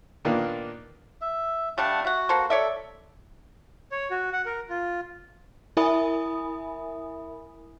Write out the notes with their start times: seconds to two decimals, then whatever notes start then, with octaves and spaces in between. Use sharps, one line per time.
0.25 A#2 D#3 A#3 B3 D4 F4
1.21 E5
1.78 G3 A3 D4 F5 F#5 A5
2.05 F#4 E5 F#5
2.29 A#3 A4 C5
2.50 A4 C#5 D5 E5
3.92 C#5
4.11 F#4
4.33 F#5
4.46 A#4
4.70 F4
5.77 E4 A#4 E5 G#5 B5 D#6